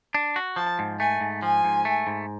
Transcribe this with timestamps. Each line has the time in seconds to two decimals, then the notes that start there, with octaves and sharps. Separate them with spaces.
0.14 D4
0.36 F#4
0.56 F3 A5
0.79 G#2
1.00 A3 G#5
1.21 G#2
1.42 F3 G#5
1.64 G#2
1.85 A3
2.07 G#2